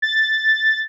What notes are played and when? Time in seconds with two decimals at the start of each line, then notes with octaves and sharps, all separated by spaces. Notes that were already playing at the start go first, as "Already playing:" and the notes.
0.02 A6